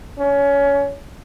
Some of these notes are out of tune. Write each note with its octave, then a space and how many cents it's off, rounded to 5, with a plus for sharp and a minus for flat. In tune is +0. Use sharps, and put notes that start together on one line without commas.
C#4 +20